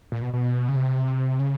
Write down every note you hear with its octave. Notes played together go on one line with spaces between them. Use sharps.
A#2
B2
B2
C#3
C3
C#3